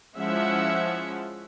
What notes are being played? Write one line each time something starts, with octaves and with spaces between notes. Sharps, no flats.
F3 G#3 C#4 E4 E5 F#5